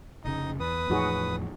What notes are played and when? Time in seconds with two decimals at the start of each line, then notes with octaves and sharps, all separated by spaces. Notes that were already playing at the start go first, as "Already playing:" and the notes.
0.25 F1 C#3 D#4 D#5
0.60 E2 B4 D#6
0.90 E2 A2 F3 D#4 F#4 G#4